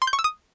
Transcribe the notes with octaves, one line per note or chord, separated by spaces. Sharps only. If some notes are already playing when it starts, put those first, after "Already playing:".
C6
G6
C#6
E6
D#6